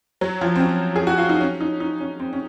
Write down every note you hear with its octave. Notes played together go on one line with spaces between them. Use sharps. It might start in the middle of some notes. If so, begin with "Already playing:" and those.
F#3
F3
C4
C#4
G#4
F#4
F4
D#4
C#4
D#4
D#4
C#4
C4
C#4